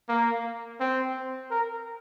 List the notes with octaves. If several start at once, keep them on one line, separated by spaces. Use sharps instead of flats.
A#3
C4
A#4